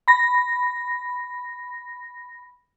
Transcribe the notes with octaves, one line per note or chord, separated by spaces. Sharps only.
B5 A#6